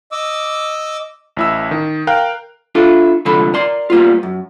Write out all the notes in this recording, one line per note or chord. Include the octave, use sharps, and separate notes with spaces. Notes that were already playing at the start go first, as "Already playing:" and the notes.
D#5 D6 E6
A1 E4 E6
D#3
A#4 F5 G5 F#6
D4 E4 F4 A4
C2 G#2 D3 F3 A4 B5
A#4 D5 C6
G3 A#3 B3 F4
F#2